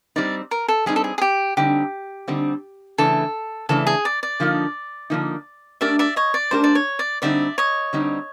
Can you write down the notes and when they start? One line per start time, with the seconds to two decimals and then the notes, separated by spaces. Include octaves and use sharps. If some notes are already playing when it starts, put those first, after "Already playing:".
0.16 G3 C4 D#4 D5
0.51 A#4
0.68 A4
0.86 G3 C4 D#4 G#4
0.96 A4
1.04 G#4
1.18 G#4
1.22 G4
1.57 D3 G3 C4 D#4 G4
2.28 D3 G3 C4 D#4
2.98 C#3 E3 A3 D4 A4
3.69 C#3 E3 A3 D4 A4
3.87 G#4
4.05 D5
4.23 D5
4.40 D3 F3 A#3 D#4
5.10 D3 F3 A#3 D#4
5.81 A3 D4 G4 A#4 D5 E5
5.99 D5 E5
6.16 C#5 D#5
6.34 D5
6.51 A3 D4 G4 A#4 C5
6.64 D5
6.75 C#5
6.99 D5
7.22 D3 G3 C4 D#4 D5 E5
7.58 C#5 D#5
7.93 D3 G3 C4 D#4